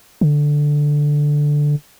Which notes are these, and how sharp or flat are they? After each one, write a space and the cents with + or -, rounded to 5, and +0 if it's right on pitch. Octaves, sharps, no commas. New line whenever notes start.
D3 +0